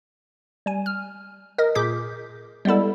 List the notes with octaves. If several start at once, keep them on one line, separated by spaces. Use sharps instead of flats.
G3 G#5
F6
A#4 D#5
A#2 G#4 D6 G6 B6
G3 G#3 B3 E4 A4